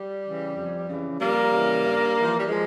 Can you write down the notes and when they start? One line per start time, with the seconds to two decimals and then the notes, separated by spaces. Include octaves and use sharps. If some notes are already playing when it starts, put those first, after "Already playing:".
Already playing: G3
0.23 C#3 E3
0.55 F2
0.88 C#3 E3
1.20 F2 G3 A#3
1.52 C#3 E3
1.84 G2
2.17 E3
2.24 F3
2.37 G3
2.48 F3 G#3